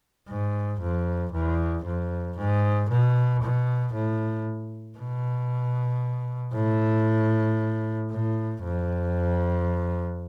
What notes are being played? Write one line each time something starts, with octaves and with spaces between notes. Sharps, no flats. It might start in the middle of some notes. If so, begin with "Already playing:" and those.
G#2
F2
E2
F2
G#2
B2
B2
A2
B2
A2
A2
F2